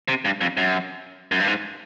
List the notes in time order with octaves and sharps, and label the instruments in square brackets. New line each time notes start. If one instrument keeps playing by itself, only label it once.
[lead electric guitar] C3
G2
F2
F#2
F#2
G2
G#2